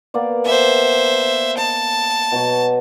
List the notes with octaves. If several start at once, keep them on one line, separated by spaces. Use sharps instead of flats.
A#3 B3 D5
C5 E5 G#5
D#5 A5
B2 F#3 F#4